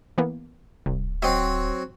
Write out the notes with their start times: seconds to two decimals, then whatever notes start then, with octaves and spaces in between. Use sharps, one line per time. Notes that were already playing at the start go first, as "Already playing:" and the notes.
0.18 E3 A#3 B3
0.86 D1 C2
1.22 F#3 C4 D#5